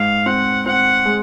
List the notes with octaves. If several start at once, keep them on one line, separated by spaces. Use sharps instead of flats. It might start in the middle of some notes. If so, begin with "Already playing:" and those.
Already playing: G#2 F5
C4 F#5
C4 F#5
G#3